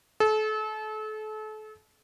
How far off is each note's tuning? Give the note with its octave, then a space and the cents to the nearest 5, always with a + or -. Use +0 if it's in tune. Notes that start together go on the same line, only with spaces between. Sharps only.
A4 -35